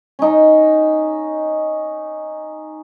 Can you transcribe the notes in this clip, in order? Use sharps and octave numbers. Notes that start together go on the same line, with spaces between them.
C#4 D#4